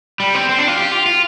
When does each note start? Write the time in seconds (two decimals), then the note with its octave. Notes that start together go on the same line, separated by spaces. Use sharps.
0.20 G3
0.35 C4
0.49 C4
0.58 D4
0.68 F4
0.78 G4
0.92 F4
1.06 F4